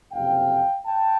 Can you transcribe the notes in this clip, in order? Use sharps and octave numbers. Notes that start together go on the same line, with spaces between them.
F#1 F2 C3 F5 G5
G5 A5